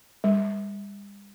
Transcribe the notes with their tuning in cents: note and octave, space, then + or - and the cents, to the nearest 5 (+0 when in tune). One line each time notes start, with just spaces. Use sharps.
G3 +45